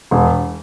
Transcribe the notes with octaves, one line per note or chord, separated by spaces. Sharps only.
E1